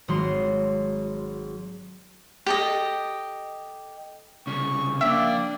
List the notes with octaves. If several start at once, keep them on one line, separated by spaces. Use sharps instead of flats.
G#1 F#3 F#4 C6
G4 A4 D#5
C2 C#3 C#6
F3 A#3 D4 E5 G5